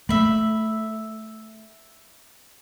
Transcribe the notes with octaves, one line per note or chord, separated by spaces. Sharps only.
A3 E5 B5